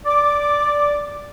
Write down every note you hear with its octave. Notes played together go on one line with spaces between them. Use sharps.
D5 D6